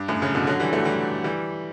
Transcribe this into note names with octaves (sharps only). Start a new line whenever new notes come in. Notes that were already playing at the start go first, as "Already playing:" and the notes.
Already playing: G2
F#2 A2
A2 C#3
B2 D3
D3 F#3
E3 G3
F#3 A3
E3 G3
E3 G3